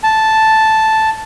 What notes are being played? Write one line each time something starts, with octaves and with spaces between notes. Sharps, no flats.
A5